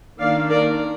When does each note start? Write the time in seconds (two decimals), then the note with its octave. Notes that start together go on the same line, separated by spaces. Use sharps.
0.19 D#3 A#3 D4 D5 F5
0.49 A#4 D5